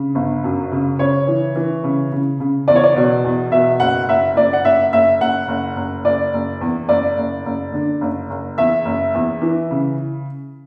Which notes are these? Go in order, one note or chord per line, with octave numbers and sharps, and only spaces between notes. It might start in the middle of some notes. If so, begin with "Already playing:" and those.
Already playing: C#3
G1
F#2
C#3
C#3 C#5
E3
E3
C#3
C#3
C#3
E2 D5
C#5
D5
B2
E2
B2 E5
F#1 F#5
F#1 E5
F#1 D5
F#5
F#1 E5
F#1 E5
F#1 F#5
F#1
F#1
F#1 D5
F#1
E2
F#1 D5
F#1
F#1
D3
F#1
F#1
E2 E5
F#1
E2
E3
C#3